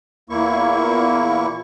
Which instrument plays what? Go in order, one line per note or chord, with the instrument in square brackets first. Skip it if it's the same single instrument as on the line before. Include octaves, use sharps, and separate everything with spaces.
[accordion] E2 A#2 A#3 E4 C#6